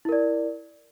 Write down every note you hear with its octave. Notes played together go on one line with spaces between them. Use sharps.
E4 A#4 D5